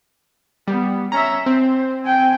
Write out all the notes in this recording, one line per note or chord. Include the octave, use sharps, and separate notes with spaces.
G3 B3
C#4 E5 A#5
C4 C5
G5 G#5